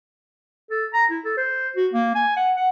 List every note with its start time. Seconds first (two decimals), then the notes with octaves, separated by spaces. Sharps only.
0.71 A4
0.94 A#5
1.10 E4
1.25 A4
1.37 C5
1.76 F#4
1.93 A#3
2.15 G#5
2.36 F#5
2.57 F#5